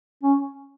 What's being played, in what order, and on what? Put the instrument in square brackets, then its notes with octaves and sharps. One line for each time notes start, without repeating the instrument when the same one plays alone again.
[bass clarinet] C#4